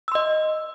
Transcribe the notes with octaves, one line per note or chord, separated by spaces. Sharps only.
D#5 C6 E6